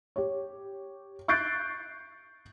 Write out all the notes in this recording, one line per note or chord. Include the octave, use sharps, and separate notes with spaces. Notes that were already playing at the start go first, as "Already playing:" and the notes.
G4 C#5
C#6 F#6 G6 A6 C7 D7